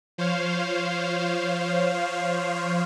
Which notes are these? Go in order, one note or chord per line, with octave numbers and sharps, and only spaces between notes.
F3 C5 C#5 F5